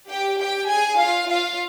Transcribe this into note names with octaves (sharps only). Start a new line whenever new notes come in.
G4 G5
G4 G5
G#4 G#5
F4 F5
F4 F5